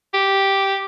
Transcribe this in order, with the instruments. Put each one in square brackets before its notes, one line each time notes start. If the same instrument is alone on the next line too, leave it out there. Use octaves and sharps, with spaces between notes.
[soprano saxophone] G4